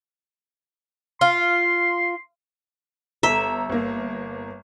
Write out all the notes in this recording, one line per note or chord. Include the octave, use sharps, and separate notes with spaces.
F4 C6
G1 A4 E5 A#5
G1 A#3